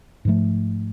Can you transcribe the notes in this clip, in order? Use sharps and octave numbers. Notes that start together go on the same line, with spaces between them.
G#2 F3 A3